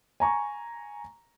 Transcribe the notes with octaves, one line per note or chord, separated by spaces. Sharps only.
G#5 A#5 C#6